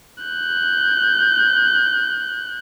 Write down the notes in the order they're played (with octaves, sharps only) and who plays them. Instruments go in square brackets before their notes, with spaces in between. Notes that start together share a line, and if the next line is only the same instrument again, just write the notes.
[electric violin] F#6 G6